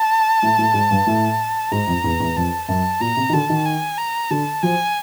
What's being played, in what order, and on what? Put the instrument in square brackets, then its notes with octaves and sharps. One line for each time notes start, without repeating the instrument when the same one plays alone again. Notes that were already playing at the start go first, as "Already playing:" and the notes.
Already playing: [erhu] A5
[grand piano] A2
A2
G#2
G2
A2
[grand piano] G#2 [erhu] A#5
[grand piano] F2
E2
E2
[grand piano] F2 [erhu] A5
[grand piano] F#2 [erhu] A5
[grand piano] A#2 [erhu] A#5
[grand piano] C3
D#3
[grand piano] D3 [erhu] A5
[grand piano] D#3
[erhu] G#5
A#5
[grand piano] D3 [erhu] A5
[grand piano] F3 [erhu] G#5